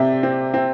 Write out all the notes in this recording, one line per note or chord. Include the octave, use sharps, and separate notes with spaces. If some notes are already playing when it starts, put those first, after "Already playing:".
Already playing: C3 C4 D5 E5 G5
C4
C4